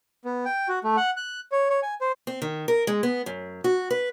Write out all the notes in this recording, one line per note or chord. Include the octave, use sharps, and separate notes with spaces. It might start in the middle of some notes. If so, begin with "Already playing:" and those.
B3
G5
F#4
A3
F#5
F#6
C#5
C#5
G#5
C5
C4
D#3
A#4
G#3
B3
F#2
F#4
B4